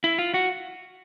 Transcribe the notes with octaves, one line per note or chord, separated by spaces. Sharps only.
E4
F4
F#4